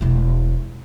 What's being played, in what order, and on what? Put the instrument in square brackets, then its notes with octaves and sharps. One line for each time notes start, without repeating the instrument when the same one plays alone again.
[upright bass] E1 E4